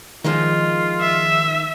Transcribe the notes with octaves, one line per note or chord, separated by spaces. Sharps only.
D#3 F3 G#3 D#4 F4
E5